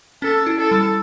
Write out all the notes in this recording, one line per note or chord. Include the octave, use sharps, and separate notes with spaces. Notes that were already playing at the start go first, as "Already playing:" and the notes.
C#4 A4
E4
A4
G3